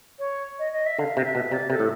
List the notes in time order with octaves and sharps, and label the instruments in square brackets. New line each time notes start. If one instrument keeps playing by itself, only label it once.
[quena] C#5
D#5
D#5
E5
[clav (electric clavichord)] D3 [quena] F5
[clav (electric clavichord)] C3 [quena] F5
[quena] E5
[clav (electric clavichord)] B2
[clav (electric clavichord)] C3 [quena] D5
[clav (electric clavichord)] C3 [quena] A4
[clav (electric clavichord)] A2